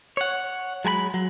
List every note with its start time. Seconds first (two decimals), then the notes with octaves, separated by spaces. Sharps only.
0.17 C#5 F#5
0.85 F#3 G#3 G#5 B5
1.14 F#3